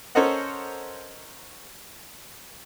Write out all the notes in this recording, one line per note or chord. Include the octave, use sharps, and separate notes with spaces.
C#4 A4 A#4 C5 D#5 F#5